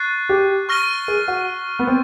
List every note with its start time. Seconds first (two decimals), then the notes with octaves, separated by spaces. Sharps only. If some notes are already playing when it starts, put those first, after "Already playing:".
Already playing: C#6 F#6 A6 C7
0.29 G4
0.69 C#6 F6 A#6 D#7 G7
1.08 G#4
1.28 F#4
1.79 B3
1.87 C4